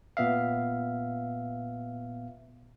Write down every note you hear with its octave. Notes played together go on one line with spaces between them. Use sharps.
A#2 B3 E5 F5